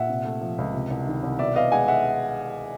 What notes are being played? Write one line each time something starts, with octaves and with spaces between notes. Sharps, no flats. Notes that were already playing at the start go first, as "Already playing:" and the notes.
Already playing: A#2 E5 F#5
C3
A3
F3
C#2
C3
C2
D#3
C2
B2 D5 E5
B3 D#5 F5
G#3 F#5 G#5
E5 F#5